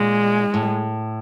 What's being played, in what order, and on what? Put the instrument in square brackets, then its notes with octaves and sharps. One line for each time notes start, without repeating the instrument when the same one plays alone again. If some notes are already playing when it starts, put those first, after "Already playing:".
Already playing: [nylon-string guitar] A#2 [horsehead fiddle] G#3
[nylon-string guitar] A2